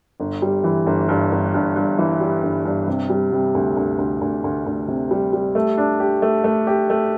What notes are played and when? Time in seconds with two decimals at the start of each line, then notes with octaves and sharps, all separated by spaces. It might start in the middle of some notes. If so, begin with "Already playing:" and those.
0.20 G1
0.42 G3
0.64 E3
0.86 G1
1.09 G2
1.32 G1
1.54 G2
1.76 G2
1.98 E3
2.20 G3
2.43 G1
2.65 G2
2.88 C3
3.10 G3
3.32 C3
3.55 D2
3.77 D2
3.99 D2
4.21 D2
4.44 D2
4.66 D2
4.88 C3
5.11 G3
5.33 G3
5.55 A3
5.78 D4
6.00 G4
6.22 A3
6.44 A3
6.67 G4
6.90 A3